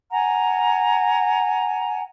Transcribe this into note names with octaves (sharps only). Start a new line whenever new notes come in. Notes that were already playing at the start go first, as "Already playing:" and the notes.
F#5 G#5 A#5